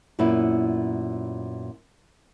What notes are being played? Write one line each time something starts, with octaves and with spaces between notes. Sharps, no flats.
F#2 A#2 B3 E4